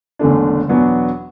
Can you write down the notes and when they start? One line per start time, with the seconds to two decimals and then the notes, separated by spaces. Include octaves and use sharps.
0.19 F#1 E2 D3 A3 D4
0.69 E2 B2 F#3 B3 D4